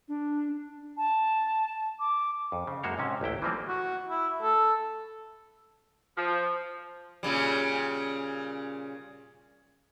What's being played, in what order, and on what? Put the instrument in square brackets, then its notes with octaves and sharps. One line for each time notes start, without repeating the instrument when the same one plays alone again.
[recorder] D4
[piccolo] A5
D6
[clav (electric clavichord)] F2
C#3
F#2 G#3 A#3 F#4 C5 C#5
G#2 C3 C#4
A1 D2 E4 G5
E3 F3 G3 A#3 C4
[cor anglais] F#4
E4
A4
[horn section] F3
[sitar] A#2 C#3 G3